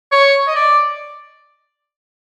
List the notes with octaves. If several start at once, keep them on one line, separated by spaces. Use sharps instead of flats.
C#5
D#5
D5